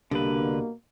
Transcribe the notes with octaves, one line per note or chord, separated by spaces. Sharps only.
C2 G2 B2 D3 A#3 B4